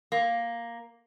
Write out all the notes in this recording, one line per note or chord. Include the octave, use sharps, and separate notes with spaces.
A#3